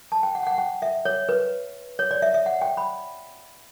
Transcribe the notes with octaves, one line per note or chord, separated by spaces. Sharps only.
A5
G5
F#5
G5
F#5
G5
E5
C#5
B4
C#5
D5
E5
E5
F#5
G5
B5